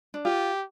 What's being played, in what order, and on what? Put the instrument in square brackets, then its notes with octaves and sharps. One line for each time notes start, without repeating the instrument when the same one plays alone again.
[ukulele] D4
[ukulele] F4 [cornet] G4